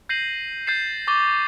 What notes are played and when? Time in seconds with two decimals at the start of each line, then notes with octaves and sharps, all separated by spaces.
0.09 G6 A#6 C7 D#7 F#7
0.67 G6 A6 C7 E7
1.07 C#6 D6 A6 G7